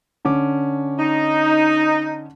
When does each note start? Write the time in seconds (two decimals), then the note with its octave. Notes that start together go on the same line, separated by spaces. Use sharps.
0.25 D3 C#4 D6
0.99 D#4